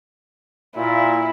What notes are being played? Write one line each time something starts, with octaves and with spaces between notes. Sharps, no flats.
A#2 E4